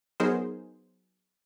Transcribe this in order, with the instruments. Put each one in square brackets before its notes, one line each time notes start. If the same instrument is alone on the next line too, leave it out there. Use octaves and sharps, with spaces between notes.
[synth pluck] F#3 B3 D#4 G#4 A#4 C5